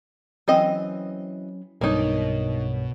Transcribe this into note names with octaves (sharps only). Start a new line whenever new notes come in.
E3 F#3 C4 C#4 D#5
B1 G2 B2 A#3 D#4 C#5